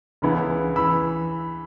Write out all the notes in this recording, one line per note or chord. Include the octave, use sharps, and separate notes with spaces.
C#2 C#3 E3 B3 E4
E3 B5 E6